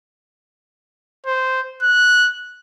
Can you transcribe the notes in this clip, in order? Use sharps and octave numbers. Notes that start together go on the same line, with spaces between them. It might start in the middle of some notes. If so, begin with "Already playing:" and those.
C5
F#6